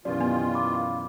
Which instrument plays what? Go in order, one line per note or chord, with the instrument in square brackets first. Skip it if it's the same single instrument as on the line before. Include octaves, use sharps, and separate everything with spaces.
[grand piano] F#2 B2 E3 [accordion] D#3 F4 [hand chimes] G4 D5
[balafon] B3
[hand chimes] F5 B5 D6